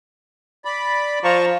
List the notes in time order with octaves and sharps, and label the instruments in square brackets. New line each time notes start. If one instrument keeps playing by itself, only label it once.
[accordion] D5 B5
[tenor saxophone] F3 [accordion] A5 A#5 C#6